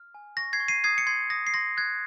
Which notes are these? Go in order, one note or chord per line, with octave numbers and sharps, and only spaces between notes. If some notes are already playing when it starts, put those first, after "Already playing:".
Already playing: F6
G#5
C#6 A#6
G#6 C7
C#6
C7 D#7
D#6 G#6 C7
C#7
C6 G#6 C7
D#6 A#6
C7
C6 A#6
F#6 G#6